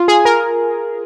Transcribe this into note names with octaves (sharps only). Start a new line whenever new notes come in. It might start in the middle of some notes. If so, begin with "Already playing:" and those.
Already playing: F4
G#4
A#4